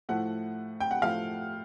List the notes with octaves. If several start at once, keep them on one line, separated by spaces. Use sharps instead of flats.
A2 F3 A3 F#5
G5
F#5
A2 F3 A3 F5